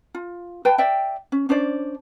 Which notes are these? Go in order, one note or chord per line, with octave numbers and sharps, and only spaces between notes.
F4
B4 G5 A5
D5 E5 G5
C#4
C#4 D4 C5 D5